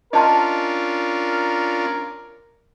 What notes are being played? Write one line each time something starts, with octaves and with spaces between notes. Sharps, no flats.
C#4 D4 F4 A#4 D#5 A5 C6